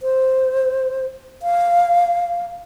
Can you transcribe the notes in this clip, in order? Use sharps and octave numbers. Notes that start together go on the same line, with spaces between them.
C5
F5